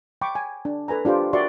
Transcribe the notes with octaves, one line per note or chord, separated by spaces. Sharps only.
G5 B5 C#6 D6
G#5
D4
A4 B4 G#5 A#5
D4 F4 G4 C5 G5
F#4 A#4 D5 E5 C6 C#6